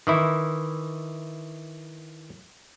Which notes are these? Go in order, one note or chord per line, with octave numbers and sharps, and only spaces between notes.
D#3 E3 E4